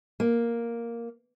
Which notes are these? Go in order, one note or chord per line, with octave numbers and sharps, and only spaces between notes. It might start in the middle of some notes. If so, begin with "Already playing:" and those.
A#3